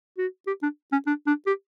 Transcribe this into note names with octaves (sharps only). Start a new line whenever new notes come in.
F#4
G4
D4
C#4
D4
D4
G4